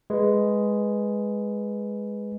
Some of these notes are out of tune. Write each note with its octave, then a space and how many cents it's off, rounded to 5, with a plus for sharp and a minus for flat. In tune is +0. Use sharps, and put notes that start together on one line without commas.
G#3 +0 B4 +0